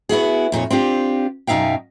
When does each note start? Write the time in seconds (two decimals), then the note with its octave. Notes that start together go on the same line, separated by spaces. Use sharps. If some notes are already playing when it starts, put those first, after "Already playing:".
0.09 B3 E4 F#4 G#4
0.52 F2 A#2 D#4 C#5
0.70 C4 D4 F4 G4
1.47 F#2 B2 D#4 E5 F5 G5